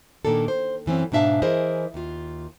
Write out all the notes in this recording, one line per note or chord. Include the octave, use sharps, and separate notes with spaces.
A#2 D#3 A#3 D4 A4
C5
F#2 E3 C4 C#4
G#2 B2 D4 E5 F5 A5
E3 E4 G#4 A#4 C5 D#5
D#2 F4